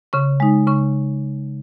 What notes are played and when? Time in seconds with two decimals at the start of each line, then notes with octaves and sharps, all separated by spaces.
0.13 C#3 C#6
0.40 G#3 D#4
0.67 C#3 C#6